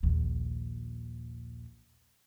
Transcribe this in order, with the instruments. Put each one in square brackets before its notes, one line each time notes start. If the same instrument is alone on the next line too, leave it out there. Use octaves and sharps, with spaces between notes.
[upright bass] A#1 D#2